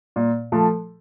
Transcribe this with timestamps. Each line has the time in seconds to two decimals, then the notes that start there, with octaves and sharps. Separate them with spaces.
0.16 A#2
0.52 F3 A3